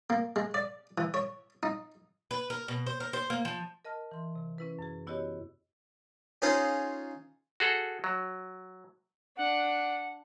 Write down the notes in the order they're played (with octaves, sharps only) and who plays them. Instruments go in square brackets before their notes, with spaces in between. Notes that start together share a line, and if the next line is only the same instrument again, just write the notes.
[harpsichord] A#3
G#3
D5
E3
C#5
D#4
[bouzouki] B4
A#4
B2
C5
A#4
C5
A#3
F3
[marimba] A#4 D#5 A5 F6
E3 C6
C3
C#4 E4 B4
F#2 G#4
B3 E4 F#4 G4 C#5 D#5
[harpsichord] C#4 D#4 F4 G#4 C5
[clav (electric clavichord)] F#4 G#4 A4
F#3
[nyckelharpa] D4 [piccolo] F#5